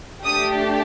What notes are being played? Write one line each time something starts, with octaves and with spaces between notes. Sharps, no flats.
A3 D4 G4 D#6